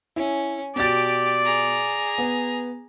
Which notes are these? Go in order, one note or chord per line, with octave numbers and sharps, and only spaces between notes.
C#4 E4
B2 G4 D5 A6
G#4 A#5
B3